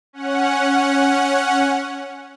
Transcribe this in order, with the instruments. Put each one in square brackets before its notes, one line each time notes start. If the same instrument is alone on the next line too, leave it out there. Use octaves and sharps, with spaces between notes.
[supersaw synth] C#4 F#5